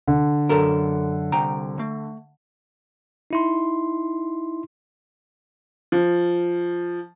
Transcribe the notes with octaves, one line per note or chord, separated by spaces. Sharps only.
D3
F#2 A4 A#4
C2 G5 A#5
A3
D#4 E4 C6
F3